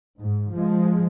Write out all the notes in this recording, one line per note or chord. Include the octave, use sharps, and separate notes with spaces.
G#2
F3 G#3